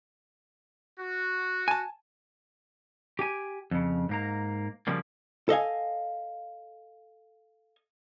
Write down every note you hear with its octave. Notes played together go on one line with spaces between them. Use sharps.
F#4
G#5 A5
G4 G5 G#5
F2 C#3
G#2 A#3 A#5
C#3 F3 G3 A#3
A4 D#5 F5 G#5